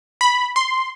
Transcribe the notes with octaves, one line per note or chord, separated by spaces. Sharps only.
B5
C6